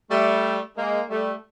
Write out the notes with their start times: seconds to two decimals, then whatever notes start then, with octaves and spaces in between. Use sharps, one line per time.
0.11 G3 A3
0.77 G#3 A#3
1.10 G3 A3